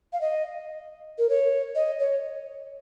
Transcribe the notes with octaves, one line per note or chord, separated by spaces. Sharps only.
F5
D#5
A#4
C#5
D#5
C#5